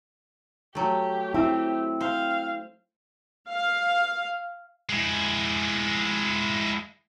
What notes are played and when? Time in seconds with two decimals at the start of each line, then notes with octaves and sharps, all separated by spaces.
0.75 F#3 A3 G4
1.34 C4 E4
2.01 C5 F5
3.48 F5
4.89 G#3 E4